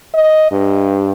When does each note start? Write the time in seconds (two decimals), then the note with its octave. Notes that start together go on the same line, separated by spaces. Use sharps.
0.14 D#5
0.52 G2